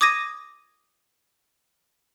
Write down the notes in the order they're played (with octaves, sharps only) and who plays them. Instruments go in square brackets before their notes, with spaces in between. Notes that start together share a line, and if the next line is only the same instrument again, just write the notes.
[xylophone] D6 D#6 G#6 A#6 D#7